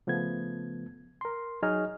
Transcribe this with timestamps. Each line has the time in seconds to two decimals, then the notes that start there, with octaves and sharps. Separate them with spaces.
0.07 C#3 F3 A3 B3 G#6
1.21 A#4 C6
1.63 F#3 D#4 G#4 C#5 D#5 F6